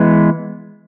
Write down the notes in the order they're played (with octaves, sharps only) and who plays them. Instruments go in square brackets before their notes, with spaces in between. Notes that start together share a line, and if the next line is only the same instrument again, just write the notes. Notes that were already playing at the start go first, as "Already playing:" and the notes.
Already playing: [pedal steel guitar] E3 G#3 B3